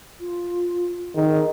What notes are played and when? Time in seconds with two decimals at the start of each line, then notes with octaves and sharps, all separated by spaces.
0.20 F4
1.15 D#3 G#4